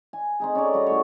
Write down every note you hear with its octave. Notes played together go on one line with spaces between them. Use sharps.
G#5
C4 D#4 G#4
C#4 A4 C#5 D5
G3 F#4 D#5
A2 C#5